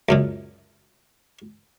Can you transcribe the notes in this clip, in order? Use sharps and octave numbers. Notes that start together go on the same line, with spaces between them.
C#2 F#2 A#2